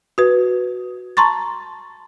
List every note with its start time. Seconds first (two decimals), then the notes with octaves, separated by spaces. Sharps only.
0.18 F#4 B4
1.17 A5 A#5 C6 C#6 A6